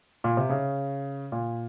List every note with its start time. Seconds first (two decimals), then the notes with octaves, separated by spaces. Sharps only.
0.24 A#2
0.37 C3
0.50 C#3
1.32 A#2